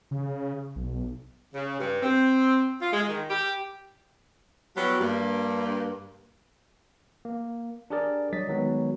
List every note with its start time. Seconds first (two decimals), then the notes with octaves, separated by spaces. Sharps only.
0.11 C#3
0.76 B1
1.54 C#3
1.80 G2
2.02 C4
2.81 F4
2.93 G#3
3.09 D#3
3.30 G4
4.77 F#3 G3 B3 E4 F#4 G4
5.01 G2 A#3
7.25 A#3
7.90 D4 G4 G#4 A#4 D5
8.33 F#3 G3 D#5 A6 B6
8.48 D#3 F#3 G#3 B3